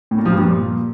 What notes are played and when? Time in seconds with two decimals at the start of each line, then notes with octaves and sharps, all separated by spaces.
0.11 A2
0.18 A#2
0.25 F3
0.33 G2
0.40 A#2